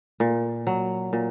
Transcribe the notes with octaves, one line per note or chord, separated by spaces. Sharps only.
A#2
F#3
A#2